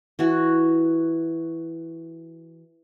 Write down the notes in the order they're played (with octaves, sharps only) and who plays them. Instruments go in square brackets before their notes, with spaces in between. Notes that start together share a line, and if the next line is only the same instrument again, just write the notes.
[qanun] E3 F#4